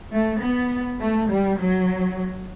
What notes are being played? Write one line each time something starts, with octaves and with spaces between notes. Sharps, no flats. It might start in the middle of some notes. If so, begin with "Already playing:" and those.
A3
B3
A3
G3
F#3